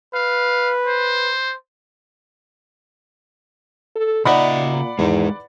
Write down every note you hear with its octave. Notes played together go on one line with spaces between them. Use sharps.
B4 F5
C5
A4
A#2 C#3 D#4 D5 E5 F#5 B5
E2 D#3 G#3 D#4